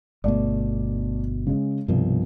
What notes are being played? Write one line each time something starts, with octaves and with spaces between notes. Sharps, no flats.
G1 B2 A3 D5
C#3 G#3
C2 G2 B2 F3